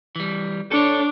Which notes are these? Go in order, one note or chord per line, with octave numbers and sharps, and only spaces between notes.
E3 G3
D4 A4 C#5